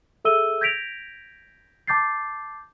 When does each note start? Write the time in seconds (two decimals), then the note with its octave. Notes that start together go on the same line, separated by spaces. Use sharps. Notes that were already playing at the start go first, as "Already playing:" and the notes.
0.25 G#4 A4 E5 E6 D#7 G7
0.61 G6 G#6 A#6 B6 D7 F7
1.87 A5 D6 G6 A6 C7